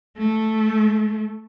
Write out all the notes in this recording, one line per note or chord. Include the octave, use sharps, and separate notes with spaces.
A3